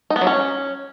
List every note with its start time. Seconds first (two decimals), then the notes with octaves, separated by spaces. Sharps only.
0.10 D#4
0.16 B3
0.21 F#3
0.27 C#4